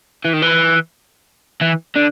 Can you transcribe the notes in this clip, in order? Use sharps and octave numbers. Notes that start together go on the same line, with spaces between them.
E3
D#3
E3
E3
D3